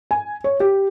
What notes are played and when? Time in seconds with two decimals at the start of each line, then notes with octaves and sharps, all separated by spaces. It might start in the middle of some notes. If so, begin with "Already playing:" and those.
0.11 G#5
0.44 C#5
0.60 G4